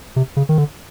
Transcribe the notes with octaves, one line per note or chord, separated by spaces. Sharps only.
C3
C#3
D#3
D3